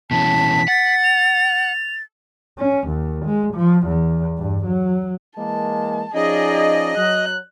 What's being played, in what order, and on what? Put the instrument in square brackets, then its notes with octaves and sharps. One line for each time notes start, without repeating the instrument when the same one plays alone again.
[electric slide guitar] B2 E3 C#4 [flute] A5 [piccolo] B6
[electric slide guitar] F#5 [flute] A6
[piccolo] F7
[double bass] C#4
D#2
G#3
F3
E2
G2
F#3
[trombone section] E3 G#3 A#3 [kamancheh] A5
[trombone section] F3 C#4 D#4 [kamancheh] G#4 D5 [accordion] D#5
[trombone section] F#3 [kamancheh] F#6